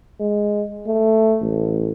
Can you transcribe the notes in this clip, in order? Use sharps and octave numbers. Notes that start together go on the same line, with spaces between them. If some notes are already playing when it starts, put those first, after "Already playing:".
G#3
A3
A1